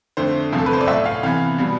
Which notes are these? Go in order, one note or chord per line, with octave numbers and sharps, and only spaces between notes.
F2 D3 A3 C5
E2 C3 F3 A3
A4
B4
C5
D5
A2 F3 A3 E5
F5
C3 E3 B3 F5
B2 G3 B3